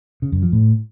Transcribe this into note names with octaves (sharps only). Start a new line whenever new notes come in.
C#3
F#2
F3
A2